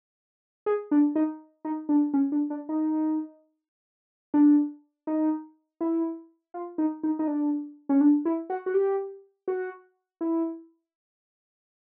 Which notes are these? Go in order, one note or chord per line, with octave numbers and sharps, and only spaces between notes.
G#4
D4
D#4
D#4
D4
C#4
D4
D4
D#4
D4
D#4
E4
F4
D#4
D#4
D#4
D4
C#4
D4
E4
F#4
F#4
G4
F#4
E4